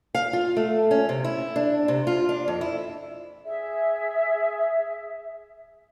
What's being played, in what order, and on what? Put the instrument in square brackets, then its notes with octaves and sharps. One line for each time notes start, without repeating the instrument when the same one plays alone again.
[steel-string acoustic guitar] F5
F4
A3
C#4
C3
E4
D4
C3
F4
D4
F2
E4
[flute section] G#4 E5